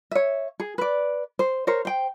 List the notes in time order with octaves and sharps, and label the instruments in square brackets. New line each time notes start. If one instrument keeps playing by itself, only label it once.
[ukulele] C#5 E5
G#4
B4 D5
C5
A#4 C5 C#5
C5 G5